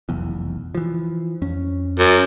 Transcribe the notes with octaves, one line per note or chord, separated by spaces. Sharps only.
F1 B1 E2
E3 F3
F2 C#4
F#2